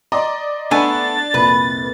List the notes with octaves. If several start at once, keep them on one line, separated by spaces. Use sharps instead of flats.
D5 D#5 A#5 C6 D6
A3 B3 D4 G#5 A6
C2 F2 A#2 B4